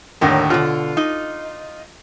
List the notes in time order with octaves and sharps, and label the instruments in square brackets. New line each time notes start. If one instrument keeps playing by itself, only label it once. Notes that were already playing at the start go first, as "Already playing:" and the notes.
[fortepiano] D#2 A2 D3 [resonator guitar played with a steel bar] A#4
[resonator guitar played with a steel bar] B2 D3 [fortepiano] F4
[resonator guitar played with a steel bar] D#4